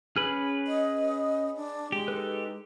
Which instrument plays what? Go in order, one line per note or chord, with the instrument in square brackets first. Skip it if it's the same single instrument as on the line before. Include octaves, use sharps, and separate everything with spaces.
[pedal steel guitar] C#4 B5 F6 [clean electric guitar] G#4 B4
[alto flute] D#5
D4
[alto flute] G#3 [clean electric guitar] G4
[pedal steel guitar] D#4 A4 B4